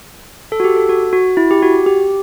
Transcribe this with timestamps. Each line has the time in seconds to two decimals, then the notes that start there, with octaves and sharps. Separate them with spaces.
0.52 A4
0.60 F#4
0.64 G4
0.76 A4
0.89 F#4
1.13 F#4
1.37 E4
1.51 G4
1.62 F#4
1.86 G4